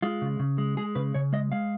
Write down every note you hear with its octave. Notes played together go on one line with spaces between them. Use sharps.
G#3 F4
C#3
C#3
G#3
G#3 G#4
C#3 B4
C#3 C#5
G#3 D#5
G#3 F5